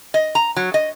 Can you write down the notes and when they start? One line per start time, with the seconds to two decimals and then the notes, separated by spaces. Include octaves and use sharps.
0.14 D#5
0.35 A#5
0.56 F#3
0.74 D#5